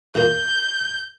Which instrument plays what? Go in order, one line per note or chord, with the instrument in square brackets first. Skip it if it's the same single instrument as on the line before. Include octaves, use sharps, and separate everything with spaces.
[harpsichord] E2 A#2 A#3 [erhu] G6